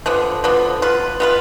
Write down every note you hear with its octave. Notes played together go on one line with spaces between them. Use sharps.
D3 F3 B3
D3 F3 B3
B3 F4 B4
B3 F4 B4